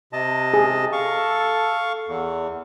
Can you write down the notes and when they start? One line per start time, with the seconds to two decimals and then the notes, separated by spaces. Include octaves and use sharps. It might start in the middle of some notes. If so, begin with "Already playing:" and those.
0.13 C3 D#5 A5
0.54 G#4
0.92 A4 F5 C#6
2.08 E2